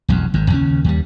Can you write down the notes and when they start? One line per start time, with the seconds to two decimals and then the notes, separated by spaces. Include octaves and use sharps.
0.08 E1 B1 F2
0.34 G#1 G#2
0.50 D#2 C#3 C#4
0.84 D#2 G3